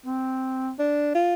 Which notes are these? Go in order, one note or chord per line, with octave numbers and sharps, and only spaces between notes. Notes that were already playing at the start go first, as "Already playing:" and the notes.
C4
D4
F4